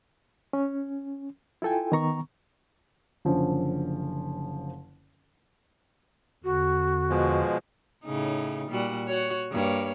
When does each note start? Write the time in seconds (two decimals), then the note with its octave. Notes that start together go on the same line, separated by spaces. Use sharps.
0.53 C#4
1.62 E4 F4 A4 G5 G#5
1.92 D#3 B3 A#5 C#6
3.25 F#1 D3 F3 C#4
6.44 E2 D3 F#4
7.10 B2 F3 G#3
8.04 A2 C#3 D#4
8.70 A#2 G3 F#4
9.08 F#4 C#5
9.51 G2 A#3 C#5